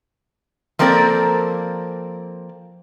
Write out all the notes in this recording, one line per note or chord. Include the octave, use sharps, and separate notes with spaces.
F3 A#3 C4 A4 A#4 D5